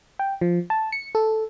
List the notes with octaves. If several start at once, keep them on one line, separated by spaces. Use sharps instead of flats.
G5
F3
A5
C#7
A4